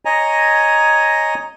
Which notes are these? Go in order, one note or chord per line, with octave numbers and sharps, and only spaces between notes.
C#5 D#5 G#5 A#5